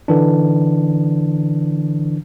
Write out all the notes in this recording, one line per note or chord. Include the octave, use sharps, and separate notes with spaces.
D3 E3 D4